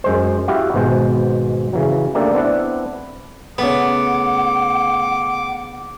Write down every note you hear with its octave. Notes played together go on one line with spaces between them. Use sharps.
F#2 G#3 C5
E4 F#4 G4 F5
G#1 G#2 B2 G#3 C5
C#3 E3 F#3
A3 A#3 D4 G4 A4 D5
B3 C4 D4 E4 D5 F#5
C#3 A3 B3 F#5 D6